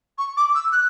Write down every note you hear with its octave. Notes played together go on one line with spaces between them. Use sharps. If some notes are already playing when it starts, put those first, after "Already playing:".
C#6
D6
E6
F#6